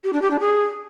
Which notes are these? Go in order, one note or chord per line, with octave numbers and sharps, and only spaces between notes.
G4
D4
G4
D4
G#4